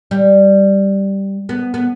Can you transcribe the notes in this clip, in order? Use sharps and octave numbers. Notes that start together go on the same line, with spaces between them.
G3
B3
B3